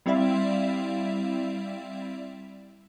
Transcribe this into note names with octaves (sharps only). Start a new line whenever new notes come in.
G3 C4 E4 D5 E5 F5